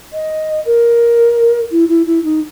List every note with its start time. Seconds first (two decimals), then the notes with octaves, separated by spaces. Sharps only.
0.13 D#5
0.66 A#4
1.71 E4
1.89 E4
2.06 E4
2.24 D#4